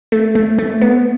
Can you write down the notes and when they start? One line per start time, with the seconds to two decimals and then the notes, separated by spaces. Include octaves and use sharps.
0.12 A3
0.35 A3
0.59 A3
0.81 B3